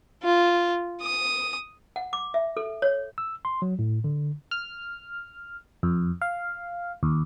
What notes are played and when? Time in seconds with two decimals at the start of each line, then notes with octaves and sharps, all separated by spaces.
0.24 F4
1.01 D#6
1.96 F#5
2.13 D6
2.34 E5
2.57 A4
2.82 C#5
3.18 E6
3.45 C6
3.62 F#3
3.79 A2
4.04 D3
4.51 F6
5.83 F2
6.21 F5
7.03 D#2